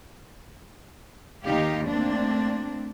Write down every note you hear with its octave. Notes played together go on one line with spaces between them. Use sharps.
D#2 D#3 D#4 G4 F5
A3 A#3 C4 D4